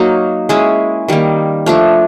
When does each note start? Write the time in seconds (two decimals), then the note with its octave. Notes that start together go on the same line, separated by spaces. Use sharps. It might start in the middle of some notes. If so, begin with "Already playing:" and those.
Already playing: F#3 A#3 D#4
0.49 G#3 C#4 E4
1.08 D#3 G3 A#3
1.66 F3 A3 D4